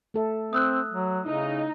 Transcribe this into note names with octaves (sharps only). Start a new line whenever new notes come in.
A3 A4 E5
C4 E5 D#6 E6 F#6
F#3
C#3 D#4 E4